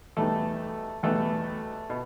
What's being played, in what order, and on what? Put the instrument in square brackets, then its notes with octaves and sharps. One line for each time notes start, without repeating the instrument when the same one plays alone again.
[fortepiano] E2 B2 G3 A3 B3 D#4 A4
E2 B2 G3 A3 B3 D#4 A4
B2